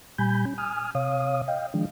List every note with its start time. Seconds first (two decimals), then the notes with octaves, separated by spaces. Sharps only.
0.18 A#2 G3 G#5 B5 G6
0.45 C#4
0.58 G#5 D#6 F6
0.95 C3 C#5 F5 D#6
1.48 D#5 F5 G5
1.74 D#3 F3 G#3 D4